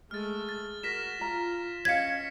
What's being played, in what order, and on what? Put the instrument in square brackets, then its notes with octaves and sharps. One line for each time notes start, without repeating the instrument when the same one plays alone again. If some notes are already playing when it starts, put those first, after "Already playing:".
[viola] G#3 A3 [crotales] F6 A6
[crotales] A6
[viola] F#4 [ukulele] A#4 [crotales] A#6 B6 E7
[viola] F4 [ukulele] A#5
[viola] C#4 [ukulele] C#5 D#5 F5 [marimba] G#6 [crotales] B6 C#7